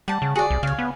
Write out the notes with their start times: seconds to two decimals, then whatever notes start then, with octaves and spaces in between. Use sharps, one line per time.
0.08 G3 F#5 A5
0.22 C#3
0.36 F#4 G#4 D5
0.50 C2
0.63 C#3 C#5 F5
0.79 B3